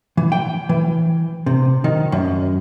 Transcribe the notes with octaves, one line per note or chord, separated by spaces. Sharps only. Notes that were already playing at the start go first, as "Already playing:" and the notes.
E3
G5
E3
C3
D#3
F#2